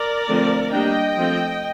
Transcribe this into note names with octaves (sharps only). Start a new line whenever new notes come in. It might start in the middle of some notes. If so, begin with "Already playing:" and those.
Already playing: A#4 D5
D3 F3 A3 C4
G3 A#3 D4 D#5 G5
F3 A3 C4